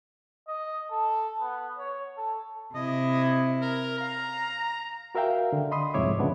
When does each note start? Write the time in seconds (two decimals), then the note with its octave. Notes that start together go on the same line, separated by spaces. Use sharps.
0.48 D#5
0.91 A4
1.40 B3
1.78 C#5
2.17 A4
2.75 C3 E4 D#5
3.61 A#4
3.98 F5 A#5
5.15 F#4 A#4 E5 F5 G5
5.53 D3
5.71 D#5 B5 C6 D#6
5.94 C2 F2 G#2 C#5 E5 D6
6.19 C#3 F3 B3 D4